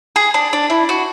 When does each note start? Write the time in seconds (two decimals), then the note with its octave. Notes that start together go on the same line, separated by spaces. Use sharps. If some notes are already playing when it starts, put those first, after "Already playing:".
0.16 G#4
0.34 D4
0.53 D4
0.70 E4
0.89 F#4